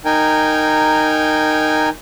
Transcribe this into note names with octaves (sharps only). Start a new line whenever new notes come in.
D#4 A#4 G5 G#5